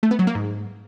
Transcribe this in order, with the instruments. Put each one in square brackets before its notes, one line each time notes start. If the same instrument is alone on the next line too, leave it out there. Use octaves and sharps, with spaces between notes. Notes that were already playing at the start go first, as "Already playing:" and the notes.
[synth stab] A3
B3
F#3
A#3
G#2